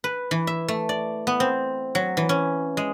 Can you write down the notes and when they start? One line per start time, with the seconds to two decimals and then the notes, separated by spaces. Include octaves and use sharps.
0.04 B4
0.31 E3
0.47 E5
0.68 A3
0.89 D5
1.27 B3
1.40 C4
1.95 F#3
2.17 E3
2.29 C#4
2.77 G#3